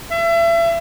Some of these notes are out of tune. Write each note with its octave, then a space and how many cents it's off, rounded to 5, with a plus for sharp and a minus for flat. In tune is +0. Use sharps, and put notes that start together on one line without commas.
E5 +35